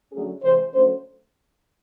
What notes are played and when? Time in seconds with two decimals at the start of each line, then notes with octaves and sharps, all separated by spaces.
0.12 D3 F#3 A3 C#4 G#4
0.42 C3 E3 G#3 C5
0.73 D3 F#3 A3 C#4 C5